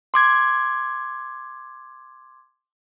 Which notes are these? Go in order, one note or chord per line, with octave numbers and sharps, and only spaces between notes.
C6 D6 G#6